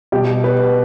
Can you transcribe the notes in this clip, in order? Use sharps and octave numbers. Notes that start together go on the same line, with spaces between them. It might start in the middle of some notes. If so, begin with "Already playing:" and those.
B2 G3 G4
B4